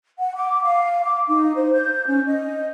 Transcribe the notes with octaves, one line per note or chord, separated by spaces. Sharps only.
F#5
D6
F5
D6
D#4
C5
G6
C#4
D#5